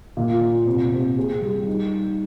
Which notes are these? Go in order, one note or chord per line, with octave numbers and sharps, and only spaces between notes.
A#2
A#2
C3
C3
G#4
G3
D#4